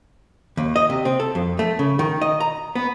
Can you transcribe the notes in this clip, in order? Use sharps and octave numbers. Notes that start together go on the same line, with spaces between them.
D#2
D#5
C3
C4
A4
F2
A3
C#3
D#3
D#5
A#5
B3